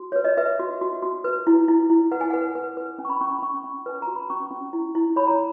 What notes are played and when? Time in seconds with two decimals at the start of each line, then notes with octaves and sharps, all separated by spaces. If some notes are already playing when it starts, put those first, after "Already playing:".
Already playing: F#4
0.12 B4 C#5
0.24 D#5
0.37 B4 E5
0.59 F#4
0.81 F#4
1.03 F#4
1.24 B4
1.47 E4
1.68 E4
1.90 E4
2.12 B4 F#5
2.21 G#5
2.30 B4 F#5
2.55 B4
2.77 B4
2.98 C#4 G#5
3.05 C#6
3.10 B5
3.21 C#4 C#6
3.32 B5
3.42 C#4 C#6
3.64 C#4
3.86 B4 G#5
4.02 A#5
4.07 F#4
4.16 B5
4.30 C#4 C#6
4.51 C#4
4.73 E4
4.95 E4
5.16 C#5 B5
5.27 A#5